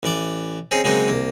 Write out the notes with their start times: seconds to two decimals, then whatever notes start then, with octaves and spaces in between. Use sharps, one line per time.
0.03 A1 E3 D5 D6
0.71 C4 C#4 D#4 G#4
0.84 C#3 F#3 G#3 A#3 C4 D#4
1.08 C2 A#3